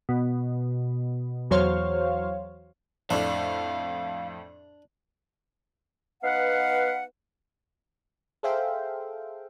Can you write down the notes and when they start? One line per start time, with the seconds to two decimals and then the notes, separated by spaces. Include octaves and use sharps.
0.09 B2
1.51 E2 F#3 C5 C#5 F5
3.10 F2 A2 D4 F5
6.24 B3 D#4 B4 F5 F#5
8.43 G#4 A4 C5 E5 F5 G5